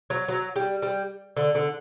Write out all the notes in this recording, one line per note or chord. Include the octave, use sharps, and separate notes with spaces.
F#3
F#3
G3
G3
D3
D3